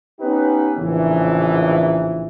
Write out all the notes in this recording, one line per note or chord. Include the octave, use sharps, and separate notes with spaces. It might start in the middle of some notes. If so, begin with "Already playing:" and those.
B3 C#4 D#4 G4 B4
A#1 A2 C#3 E3